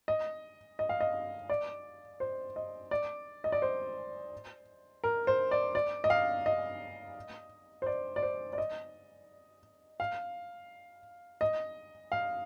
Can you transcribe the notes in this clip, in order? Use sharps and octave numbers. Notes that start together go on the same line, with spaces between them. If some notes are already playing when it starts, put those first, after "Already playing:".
D#5
D#5
F5
D#5
D5
C5
D#5
D5
D#5
D5
C5
A#4
C5
D5
D5
D#5
F5
D#5
C5
D5
D5
C5
D5
D#5
F5
D#5
F5